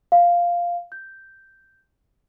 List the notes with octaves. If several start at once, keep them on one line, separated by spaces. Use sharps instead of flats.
F5
G6